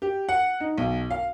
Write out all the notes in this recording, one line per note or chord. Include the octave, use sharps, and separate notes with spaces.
G4
F#5
D#4
B1
F5